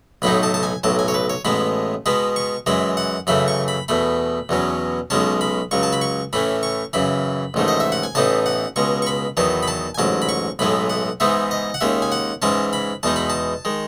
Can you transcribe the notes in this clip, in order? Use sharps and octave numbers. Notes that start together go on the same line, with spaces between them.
B1 A2 F#3 B3 D#4 B5
A5
A5
G#5
B1 A2 F#3 A5
G#5
C#5
B4
C#5
A1 A2 G#3 B3 B5
B2 G#3 B3 B5
C#6
F#2 E3 G#3 B5
F#5
F#2 C#3 E3 A3 B5
C#6
B5
E2 B2 A3 B5
E2 B2 F#3 C#4
B1 B2 G#3 C#4 A5
B5
C#2 C#3 F#3 C#6
A5
B5
C#6
A2 E3 A3 C#4 B5
C#6
F#2 C#3 E3 B5
A1 G#2 D#3 A3
D#5
E5
F#5
G#5
A1 A2 E3 B3 D#4 A5
F#5
C#2 B2 G#3 C#6
C#6
B5
E2 D#3 F#3 B3 A5
B5
A5
G#5
A1 G#2 F#3 A5
B5
C#6
B1 A2 E3 G#3 B3 B5
F#5
G#2 E3 G#3 B3 D#4 E5
D#5
F#5
D#2 D#3 G#3 C#4 E5
G#5
F#5
G#2 E3 G#3 C#4 A5
B5
E2 B2 G#3 D#4 A5
B5
A5
D#3 G#3